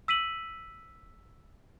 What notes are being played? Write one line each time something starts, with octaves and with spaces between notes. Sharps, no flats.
E6 B6 D#7 F#7